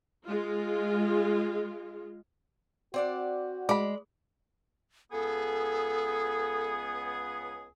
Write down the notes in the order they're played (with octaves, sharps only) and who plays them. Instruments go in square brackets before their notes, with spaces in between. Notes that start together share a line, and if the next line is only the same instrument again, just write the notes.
[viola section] G#3 F4
[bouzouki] C4 D5 F#5 [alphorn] F#4
[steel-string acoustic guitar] G#3 [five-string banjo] D5 B5
[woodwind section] C#2 B3 G#4 [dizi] A4